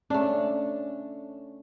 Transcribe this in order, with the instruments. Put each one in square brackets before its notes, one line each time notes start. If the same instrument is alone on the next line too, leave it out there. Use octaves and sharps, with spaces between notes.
[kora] A3 D4 [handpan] C#4